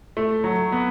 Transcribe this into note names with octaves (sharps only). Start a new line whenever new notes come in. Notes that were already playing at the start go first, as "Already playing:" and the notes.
A3
F#3
B3